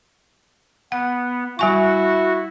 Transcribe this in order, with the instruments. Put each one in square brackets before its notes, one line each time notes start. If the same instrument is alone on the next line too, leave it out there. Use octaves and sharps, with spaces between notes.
[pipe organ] B3 [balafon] F#5
[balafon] G3 G#5 C#6 [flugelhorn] E4 [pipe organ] F#4